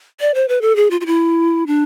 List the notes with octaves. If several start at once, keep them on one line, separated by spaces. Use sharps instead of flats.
D5
C5
B4
A4
G#4
F4
F4
E4
D4